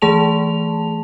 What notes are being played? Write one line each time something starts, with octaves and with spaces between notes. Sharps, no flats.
E3 A3 G#4 A5 F7